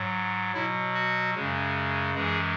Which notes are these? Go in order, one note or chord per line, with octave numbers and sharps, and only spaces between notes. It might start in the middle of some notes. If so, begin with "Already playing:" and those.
Already playing: G#2 F#3
B2 F#3 E4
F#4
F#2 C#3 G#3
F#2 E3 G#3 G#4